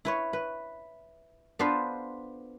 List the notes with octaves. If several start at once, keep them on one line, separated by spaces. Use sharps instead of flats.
E4 B4 C#5
B4
B3 D4 F4 A4 B4 C5